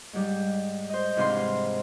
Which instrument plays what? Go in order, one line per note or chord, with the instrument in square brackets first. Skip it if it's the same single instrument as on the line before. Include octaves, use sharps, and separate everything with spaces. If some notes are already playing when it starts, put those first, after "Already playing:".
[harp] G#2 G3
C5 D#5
G#2 C3 E3 D4 F5 C6